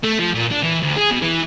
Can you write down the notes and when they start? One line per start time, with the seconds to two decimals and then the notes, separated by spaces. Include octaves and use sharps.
0.03 A3
0.19 F3
0.34 A#2
0.51 D4
0.63 E3
0.82 D2
0.97 G#4
1.10 B2
1.22 E3